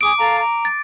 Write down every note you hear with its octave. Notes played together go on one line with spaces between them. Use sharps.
G#4 D6 D#6 D7
A4 F5 A#5
A#5
A6